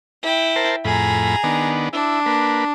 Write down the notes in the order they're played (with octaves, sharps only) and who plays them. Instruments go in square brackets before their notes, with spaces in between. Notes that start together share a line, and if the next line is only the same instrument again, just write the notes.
[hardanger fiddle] E4 G5
[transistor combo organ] A#4 C5 A5
[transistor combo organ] F2 A2 B5 [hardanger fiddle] G#4 A#5
[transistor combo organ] D#3 B3 D4
[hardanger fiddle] D4 [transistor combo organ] E4
[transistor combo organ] A#3 B4